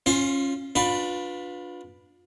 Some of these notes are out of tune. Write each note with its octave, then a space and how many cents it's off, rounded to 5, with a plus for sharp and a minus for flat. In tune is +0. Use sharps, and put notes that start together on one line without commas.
C#4 -15 F4 +0 C5 +30
D4 +0 F4 +30 B4 +0